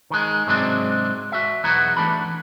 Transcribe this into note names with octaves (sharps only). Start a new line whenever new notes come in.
D#3 G#3
G#2 C3 F#3 G#3 C4 D4
F#4 E5
B1 E2 B3 E4 F#4 A#5
E3 A3 D4 B5